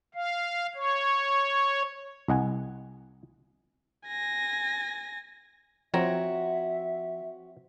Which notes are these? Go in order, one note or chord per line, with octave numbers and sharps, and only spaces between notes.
F5
C#5
C2 D#5 F#5 G#5
G#5 A#6
F3 C4 F#4 C#5 E5 A#5